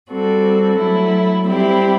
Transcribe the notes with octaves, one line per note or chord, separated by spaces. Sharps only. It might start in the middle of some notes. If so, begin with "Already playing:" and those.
G3 C4 F#4 A4
F#3 A3 E4
G3 C4 E4 G4